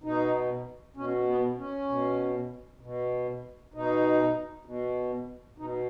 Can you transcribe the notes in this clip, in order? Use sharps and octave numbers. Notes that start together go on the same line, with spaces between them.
B2 D#4
B2 C#4
B3
C#4
B2
B2
B2 D#4
B2
B2 D#4